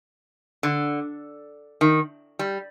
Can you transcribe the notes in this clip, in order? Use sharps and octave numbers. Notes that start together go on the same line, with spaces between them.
D3
D#3
G3